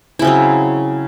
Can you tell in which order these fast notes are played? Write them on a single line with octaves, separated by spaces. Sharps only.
E4 C#3 C4 F#3